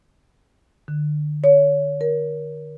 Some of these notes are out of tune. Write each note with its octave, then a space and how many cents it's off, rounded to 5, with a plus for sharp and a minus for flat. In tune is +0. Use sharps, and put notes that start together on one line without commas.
D3 +30
C#5 +25
A#4 +25